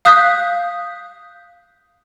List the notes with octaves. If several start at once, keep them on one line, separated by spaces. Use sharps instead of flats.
F5 D#6 F#6 G6 B6